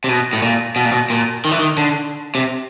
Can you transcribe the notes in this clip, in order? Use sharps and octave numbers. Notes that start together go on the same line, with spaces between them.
C3
B2
A2
A#2
B2
A#2
B2
A#2
D#3
E3
D#3
D3
C3